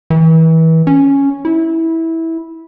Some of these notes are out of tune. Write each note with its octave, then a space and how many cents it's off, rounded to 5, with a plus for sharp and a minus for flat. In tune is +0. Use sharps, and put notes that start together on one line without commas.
E3 -30
C#4 +0
E4 -15